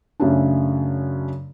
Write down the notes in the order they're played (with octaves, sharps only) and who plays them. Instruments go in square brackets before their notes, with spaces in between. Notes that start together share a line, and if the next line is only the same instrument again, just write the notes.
[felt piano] F#2 C#3 A3 C#4 D4